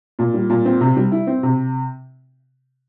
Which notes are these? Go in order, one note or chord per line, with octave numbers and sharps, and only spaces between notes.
A#2
G3
A#2
C4
C3
G3
E4
C4
C3